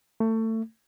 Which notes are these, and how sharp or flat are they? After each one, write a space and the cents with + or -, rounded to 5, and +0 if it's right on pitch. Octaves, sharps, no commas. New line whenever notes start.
A3 +25